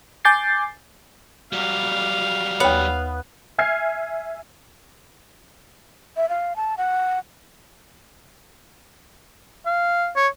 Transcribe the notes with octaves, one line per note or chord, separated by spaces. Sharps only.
G#5 D6 G6 A6 C7
F#3 G3 F5
D#2 B3 C#5
E5 G#5 F6 G#6 C7
E5
F5
A5
F#5
F5
C#5